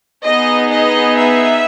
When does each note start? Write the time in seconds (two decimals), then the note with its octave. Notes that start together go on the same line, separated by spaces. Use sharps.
0.24 B3 D#4 G#4 D#5
0.70 D#5
1.16 E5